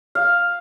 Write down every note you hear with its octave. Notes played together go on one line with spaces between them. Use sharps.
F5